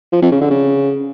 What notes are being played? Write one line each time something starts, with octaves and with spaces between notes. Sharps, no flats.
F3
F2
C#3
D3
C#3